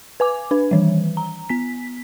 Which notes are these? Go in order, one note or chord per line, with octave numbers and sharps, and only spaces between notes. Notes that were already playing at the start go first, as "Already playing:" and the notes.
B4 G#5 D6
D4 B4
D#3 E3 G3
A#5
B3 B6